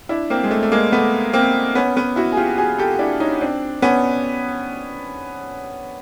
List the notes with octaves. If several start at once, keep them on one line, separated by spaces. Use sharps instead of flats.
D4 E4
A#3 C4
G#3
A3
A3
G#3 A#3
A3 B3
A#3 C4
B3 C#4
B3 C#4
E4 F#4
G#4
F4 G4
F#4 G#4
G4 A4
D4 E4
C#4 D#4
C4 D4
B3 C#4